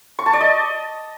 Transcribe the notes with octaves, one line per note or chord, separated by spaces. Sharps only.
C#6
A5
D5
D#5